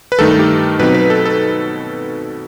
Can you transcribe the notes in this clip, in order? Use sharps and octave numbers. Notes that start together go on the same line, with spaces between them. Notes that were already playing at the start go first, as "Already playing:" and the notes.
B4
G2 D#3 A3 D#4 A4
G4
B2 F#3 C4 D#4 B4
B4
A4
A4